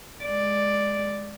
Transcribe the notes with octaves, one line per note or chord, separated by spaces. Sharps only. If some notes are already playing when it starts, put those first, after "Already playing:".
G#3 D5